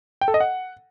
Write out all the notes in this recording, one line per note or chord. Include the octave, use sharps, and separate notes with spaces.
G5
A4
D#5
F#5